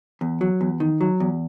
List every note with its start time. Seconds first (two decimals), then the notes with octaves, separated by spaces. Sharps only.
0.21 E2
0.41 F#3
0.61 E2
0.80 D#3
1.01 F#3
1.20 E2